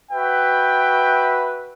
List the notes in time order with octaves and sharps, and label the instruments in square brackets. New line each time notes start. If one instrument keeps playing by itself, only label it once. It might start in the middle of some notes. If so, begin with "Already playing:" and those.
[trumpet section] F#4 B4 E5 G5